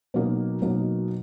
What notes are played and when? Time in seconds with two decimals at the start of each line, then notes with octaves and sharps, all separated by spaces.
0.14 B2 F#3 A#3 D#4
0.62 B2 F#3 A#3 D#4